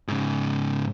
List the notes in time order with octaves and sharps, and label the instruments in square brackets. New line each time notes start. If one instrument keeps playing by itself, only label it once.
[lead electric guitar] G#2 C#3